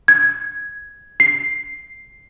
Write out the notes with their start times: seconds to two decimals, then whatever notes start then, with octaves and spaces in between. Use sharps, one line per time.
0.08 G#6
1.20 C7